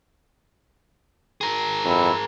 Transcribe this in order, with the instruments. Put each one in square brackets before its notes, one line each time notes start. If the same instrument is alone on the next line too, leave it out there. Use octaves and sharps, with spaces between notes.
[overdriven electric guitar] G#4 A#4
[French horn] F2 [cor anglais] E4